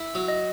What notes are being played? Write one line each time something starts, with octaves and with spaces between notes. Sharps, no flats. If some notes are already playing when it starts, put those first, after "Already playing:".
Already playing: E4
F#3
D#5